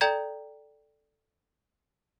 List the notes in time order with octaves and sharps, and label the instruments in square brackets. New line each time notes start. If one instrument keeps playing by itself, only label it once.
[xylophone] A4 D5 G5 A#5 G6 G#6